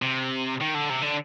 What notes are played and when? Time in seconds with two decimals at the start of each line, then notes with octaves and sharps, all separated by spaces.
0.02 C3
0.60 D#3
0.74 D3
0.89 C3
1.02 D3